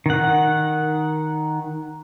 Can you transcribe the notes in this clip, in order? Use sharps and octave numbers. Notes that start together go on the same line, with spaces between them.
D#3 F#5